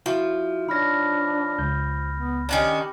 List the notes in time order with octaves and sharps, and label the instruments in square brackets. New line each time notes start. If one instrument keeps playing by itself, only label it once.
[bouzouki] F3 [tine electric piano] E4 F#4 E5
[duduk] D4 [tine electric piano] D#4 C#5 [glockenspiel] B5 F6 A#6
[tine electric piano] C#2 G6
[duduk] B3
[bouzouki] D#3 C#4 D4 [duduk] G4